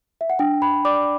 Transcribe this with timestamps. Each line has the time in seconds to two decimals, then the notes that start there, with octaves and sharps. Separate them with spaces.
0.21 E5
0.30 F#5
0.39 D4 G5
0.62 B5
0.85 D5 D6